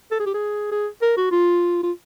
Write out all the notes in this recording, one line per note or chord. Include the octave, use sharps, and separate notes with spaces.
A4
G#4
G4
G#4
G#4
A#4
F#4
F4
F4